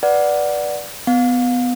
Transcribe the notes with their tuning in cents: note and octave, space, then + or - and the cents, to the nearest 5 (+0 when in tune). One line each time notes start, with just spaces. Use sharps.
B4 -10 D5 +0 F#5 +0
B3 +15 F5 +30